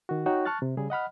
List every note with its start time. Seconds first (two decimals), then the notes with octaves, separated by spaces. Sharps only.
0.09 D#3 F#4
0.26 D#4 F#4 C#5 G5
0.45 A5 C#6 F6 F#6 A6
0.62 C3
0.77 C#3 G3 G#4
0.90 D#5 F#5 B5 F6